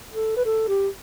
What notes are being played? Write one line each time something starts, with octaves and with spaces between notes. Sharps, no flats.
A4
B4
A4
G4